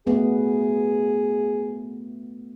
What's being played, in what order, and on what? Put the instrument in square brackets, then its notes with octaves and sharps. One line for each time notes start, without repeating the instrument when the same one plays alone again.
[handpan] A3 B3 [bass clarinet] G#4